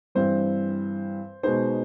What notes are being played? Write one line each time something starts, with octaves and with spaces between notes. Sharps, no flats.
G2 E3 G3 C4 C5
B2 G#3 B3 D#4 C5